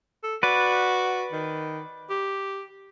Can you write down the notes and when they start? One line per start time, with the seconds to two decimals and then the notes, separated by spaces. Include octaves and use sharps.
0.23 A4
0.43 F#4 B4 D5
1.32 D#3
2.10 G4